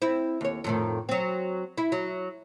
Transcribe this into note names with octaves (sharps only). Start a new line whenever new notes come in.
C4 E4
D#2 C#5
F2 A2 D#3
F#3 C4
E4
F#3